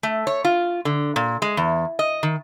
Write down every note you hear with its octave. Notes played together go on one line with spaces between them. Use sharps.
A3
C#5
F4
D3
A#2
G#3
E2
D#5
D#3